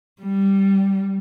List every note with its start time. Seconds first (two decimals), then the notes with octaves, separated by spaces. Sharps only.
0.21 G3